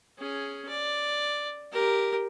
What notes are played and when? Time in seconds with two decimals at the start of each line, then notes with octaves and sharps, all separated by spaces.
0.18 C#4 G#4
0.68 D5
1.72 G4 A#4